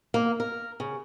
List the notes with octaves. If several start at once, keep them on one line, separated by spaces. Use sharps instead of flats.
A#3
A#4
C#3